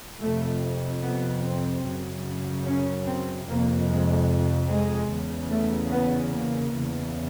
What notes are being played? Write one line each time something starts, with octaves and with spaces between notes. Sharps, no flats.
F2 C3 A3
B3
C4
F#2 C#3
C#4
C4
F2 C3 A#3
G#3
G#3
E2 C#3
A3
B3
A#3
E2 C#3